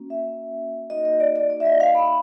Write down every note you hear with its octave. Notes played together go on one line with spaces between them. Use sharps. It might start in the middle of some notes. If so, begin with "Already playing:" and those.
Already playing: A#3 C#4 F#4
E5
A#3 D#4 F#4 D#5
D#5
D5
D5
D5
E5
D#5
F5
B5